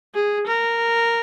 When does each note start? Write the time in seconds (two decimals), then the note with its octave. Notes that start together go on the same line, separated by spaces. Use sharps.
0.15 G#4
0.47 A#4